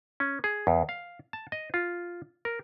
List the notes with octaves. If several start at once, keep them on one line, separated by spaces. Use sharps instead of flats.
C#4
G#4
E2
F5
A5
D#5
F4
A#4